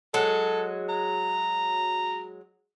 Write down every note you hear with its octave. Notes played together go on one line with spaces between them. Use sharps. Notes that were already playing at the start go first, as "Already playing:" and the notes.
F#3 G#3 A4
A#5